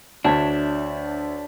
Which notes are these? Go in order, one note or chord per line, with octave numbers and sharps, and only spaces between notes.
D2 D4 C#5 E5 A5